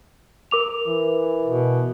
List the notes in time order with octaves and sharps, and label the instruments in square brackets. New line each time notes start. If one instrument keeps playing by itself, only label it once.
[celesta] A#4 D6 F7
[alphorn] E3
[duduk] B2